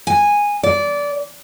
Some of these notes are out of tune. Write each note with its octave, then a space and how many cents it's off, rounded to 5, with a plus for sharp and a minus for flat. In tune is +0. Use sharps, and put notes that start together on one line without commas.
G#5 -10
D5 -20